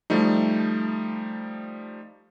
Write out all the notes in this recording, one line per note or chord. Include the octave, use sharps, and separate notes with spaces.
F3 G3 A3 D#4